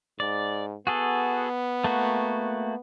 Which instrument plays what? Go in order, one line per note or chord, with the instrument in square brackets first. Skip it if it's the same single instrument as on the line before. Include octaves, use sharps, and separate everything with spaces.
[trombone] G#2 [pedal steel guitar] D5
[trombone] B3 [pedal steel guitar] F#4 G#4 A4
[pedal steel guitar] A3 A#3 F#4